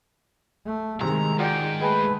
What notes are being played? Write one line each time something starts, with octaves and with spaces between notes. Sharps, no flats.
A3
C2 C3 D#3 G#3 A#5
G#2 F4 F#4 D5 G5
G#3 A3 G#4 B4 G5 A5